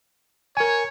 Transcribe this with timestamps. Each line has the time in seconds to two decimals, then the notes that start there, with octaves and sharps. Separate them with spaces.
0.57 A#4 C#5 G#5